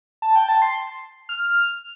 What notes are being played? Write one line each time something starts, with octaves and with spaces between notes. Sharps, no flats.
A5
G5
A5
C6
F6